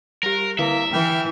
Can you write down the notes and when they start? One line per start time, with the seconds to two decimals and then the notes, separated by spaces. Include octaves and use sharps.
0.23 G3 G4 A#4
0.59 D3 A#3 E4 B4 E5
0.93 E3 G5 F6